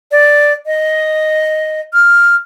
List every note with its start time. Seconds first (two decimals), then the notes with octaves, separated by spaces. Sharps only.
0.12 D5
0.66 D#5
1.93 F6